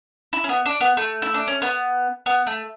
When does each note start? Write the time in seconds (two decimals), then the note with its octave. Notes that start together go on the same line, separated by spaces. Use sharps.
0.33 E4
0.44 C#4
0.49 B3
0.66 D4
0.81 B3
0.97 A3
1.22 E4
1.34 D4
1.48 C#4
1.62 B3
2.26 B3
2.47 A3